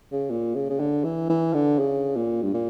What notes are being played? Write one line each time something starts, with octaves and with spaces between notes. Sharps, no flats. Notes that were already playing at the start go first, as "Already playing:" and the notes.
C#3
A#2
C#3
C#3
D3
E3
E3
D3
C#3
A#2
G2
A#2